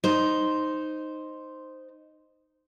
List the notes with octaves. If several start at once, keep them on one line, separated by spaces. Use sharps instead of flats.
D#4 C5